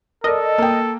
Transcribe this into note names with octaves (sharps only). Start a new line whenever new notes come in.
A4 A#4 D5 D#5
A#3 G5